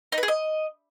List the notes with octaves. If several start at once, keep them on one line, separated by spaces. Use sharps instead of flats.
D#4
B4
G#4
D#5